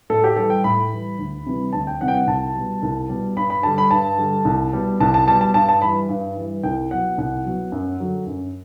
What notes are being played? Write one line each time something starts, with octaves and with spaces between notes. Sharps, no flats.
A2 A4
G4
E3 G3 A4
G5
A2 B5
E3 G3
D2
C3 E3 G3
D2 A5
G5
C3 E3 G3 F#5
G5
F#5
C2 A5
B2 G3
C2
B2 G3
G2 B5
B5
D3 G3 A5
B5
G2 A5
D3 G3
C2
B2 G3
C2 A5
A5
B2 G3 A5
A5
G2 A5
A5
E3 G3 B5
G2
E3 G3
C2 G5
B2 F#3 F#5
C2 F#5
B2 F#3
F#2
D3 F#3
F#2